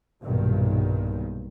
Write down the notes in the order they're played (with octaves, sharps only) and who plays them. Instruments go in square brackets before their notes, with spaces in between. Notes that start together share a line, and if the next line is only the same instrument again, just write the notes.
[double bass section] B1 G2 A#2 D#3